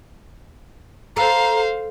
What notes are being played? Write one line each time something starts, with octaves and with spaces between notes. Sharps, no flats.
A4 C5 F5 A#5